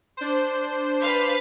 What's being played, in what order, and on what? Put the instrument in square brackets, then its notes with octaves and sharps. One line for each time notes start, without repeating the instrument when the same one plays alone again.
[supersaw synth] D4 C5
[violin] B4 F5